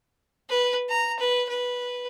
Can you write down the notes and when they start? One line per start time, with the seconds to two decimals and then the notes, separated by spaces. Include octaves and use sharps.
0.50 B4
0.89 A#5
1.19 B4
1.49 B4